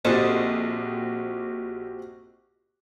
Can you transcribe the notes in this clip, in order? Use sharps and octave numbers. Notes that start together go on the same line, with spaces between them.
A#1 C4 F#4 G4 A4 C5 D#5